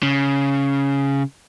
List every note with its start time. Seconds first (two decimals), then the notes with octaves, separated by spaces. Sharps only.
0.03 C#3